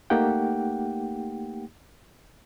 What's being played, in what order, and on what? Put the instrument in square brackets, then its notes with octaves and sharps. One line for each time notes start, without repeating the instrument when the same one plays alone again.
[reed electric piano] A3 A#3 D#4 G4 F#5 G5